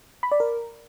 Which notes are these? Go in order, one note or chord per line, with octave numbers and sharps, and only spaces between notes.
B5
D5
A#4